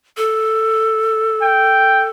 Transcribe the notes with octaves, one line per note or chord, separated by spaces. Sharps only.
A4
G5